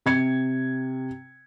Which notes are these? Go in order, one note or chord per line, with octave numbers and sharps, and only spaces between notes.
C3 G#6 C#7